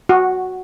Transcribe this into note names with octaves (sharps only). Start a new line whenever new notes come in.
F#4